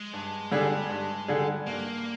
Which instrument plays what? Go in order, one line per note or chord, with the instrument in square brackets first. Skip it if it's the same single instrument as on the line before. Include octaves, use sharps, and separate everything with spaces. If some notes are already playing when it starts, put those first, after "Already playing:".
Already playing: [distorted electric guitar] G#3
[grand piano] G2
D3 G3 D4 G#4
G2
D3 G3 D4 G#4
[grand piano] G2 [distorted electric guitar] A#3